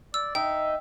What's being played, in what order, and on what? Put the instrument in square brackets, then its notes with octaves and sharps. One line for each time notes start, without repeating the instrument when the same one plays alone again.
[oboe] D5 [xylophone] E6
[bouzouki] D#4 [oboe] E5 [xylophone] G5